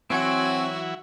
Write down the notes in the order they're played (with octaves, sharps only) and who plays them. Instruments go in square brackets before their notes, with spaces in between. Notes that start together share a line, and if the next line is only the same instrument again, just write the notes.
[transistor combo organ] E3 F#3 E4 [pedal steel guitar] C4 G#5 [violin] F#4 [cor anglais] C#5